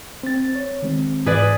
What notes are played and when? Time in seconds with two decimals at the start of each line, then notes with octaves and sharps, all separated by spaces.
0.23 C4 A6
0.56 C#5
0.82 D#3 G#3 C4
1.26 G#2 E3 G#4 B4 D5